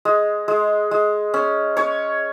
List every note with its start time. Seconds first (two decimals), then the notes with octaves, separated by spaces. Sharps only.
0.05 G#3
0.48 G#3
0.91 G#3
1.34 C#4
1.77 C#4 C#5